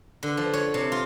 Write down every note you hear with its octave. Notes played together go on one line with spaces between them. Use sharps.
D3
F3
C#5
C3
F4